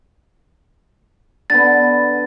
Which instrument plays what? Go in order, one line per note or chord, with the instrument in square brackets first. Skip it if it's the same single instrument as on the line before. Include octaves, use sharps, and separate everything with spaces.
[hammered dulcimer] D3 B3 [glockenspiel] A6